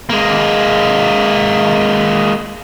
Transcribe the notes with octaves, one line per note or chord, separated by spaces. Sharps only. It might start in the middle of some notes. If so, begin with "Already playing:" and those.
G#3 A#3